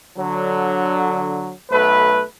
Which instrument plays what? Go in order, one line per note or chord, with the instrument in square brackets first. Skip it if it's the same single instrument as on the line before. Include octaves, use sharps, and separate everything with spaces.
[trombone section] D3 F#3
B1 A3 B4